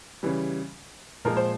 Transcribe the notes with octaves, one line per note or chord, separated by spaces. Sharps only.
C#3 E3 G3
A#2 F3 G#3 A#4
C5